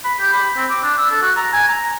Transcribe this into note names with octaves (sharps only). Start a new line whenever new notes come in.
B5
G4
B5
C4
D6
D4
E6
A4
F#4
A#5
G#5
A#5